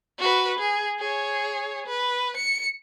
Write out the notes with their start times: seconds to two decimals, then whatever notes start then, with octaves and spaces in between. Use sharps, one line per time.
0.19 F#4 B4
0.59 G#4
0.99 G#4 C#5
1.86 B4
2.36 C#7